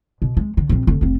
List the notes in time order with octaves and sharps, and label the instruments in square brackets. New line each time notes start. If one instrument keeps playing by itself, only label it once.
[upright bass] B2
G#3
D3
A#1 C4
F1 D3
F1 C4